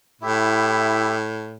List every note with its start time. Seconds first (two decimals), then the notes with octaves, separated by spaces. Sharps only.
0.21 A2 E4 G4 E5